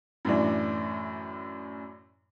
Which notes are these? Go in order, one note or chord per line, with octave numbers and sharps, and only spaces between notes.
F#2 A2 E3 D4